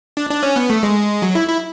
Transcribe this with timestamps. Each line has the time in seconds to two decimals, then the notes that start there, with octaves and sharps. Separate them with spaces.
0.17 D4
0.30 D4
0.43 C#4
0.56 B3
0.70 A3
0.83 G#3
1.22 F#3
1.35 E4
1.49 E4